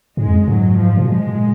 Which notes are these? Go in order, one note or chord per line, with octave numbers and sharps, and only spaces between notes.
G#2 G#3
F2
F#2
G#2 F#3
F3
B2
A#2 G#3